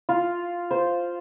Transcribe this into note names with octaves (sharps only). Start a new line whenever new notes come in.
F4
C5